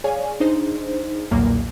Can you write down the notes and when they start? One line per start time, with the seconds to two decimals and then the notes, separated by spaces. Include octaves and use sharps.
0.04 G#4 C#5 D5 F5 G#5
0.40 D4 D#4 G#4 C5
1.31 B1 E2 A#2 F#3 G3 A#3